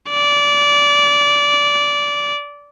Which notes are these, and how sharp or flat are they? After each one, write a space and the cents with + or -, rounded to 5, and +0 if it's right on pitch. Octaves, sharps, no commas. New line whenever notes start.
D5 -20